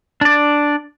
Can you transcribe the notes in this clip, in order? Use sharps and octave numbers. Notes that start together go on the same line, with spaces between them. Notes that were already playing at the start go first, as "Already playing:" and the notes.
D4 D5